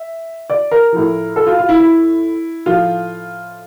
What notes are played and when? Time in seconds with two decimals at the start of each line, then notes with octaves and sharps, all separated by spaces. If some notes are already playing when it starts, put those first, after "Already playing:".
Already playing: E5
0.50 D5
0.71 A#4
0.92 A2 F3
1.36 A4
1.47 F4
1.58 F4
1.69 E4
1.80 E4
2.66 A2 F3 F4